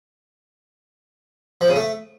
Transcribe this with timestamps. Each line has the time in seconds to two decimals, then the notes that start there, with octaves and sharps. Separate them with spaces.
1.61 F3
1.68 C#3
1.76 A3